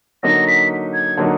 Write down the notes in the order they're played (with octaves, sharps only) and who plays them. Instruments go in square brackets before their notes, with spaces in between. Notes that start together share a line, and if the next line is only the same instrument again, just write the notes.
[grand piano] D3 F#3 A#3 D#4 [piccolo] A#6
[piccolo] B6
G#6
[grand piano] D3 F#3 A#3 D#4